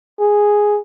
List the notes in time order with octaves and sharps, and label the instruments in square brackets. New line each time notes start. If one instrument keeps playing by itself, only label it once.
[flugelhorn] G#4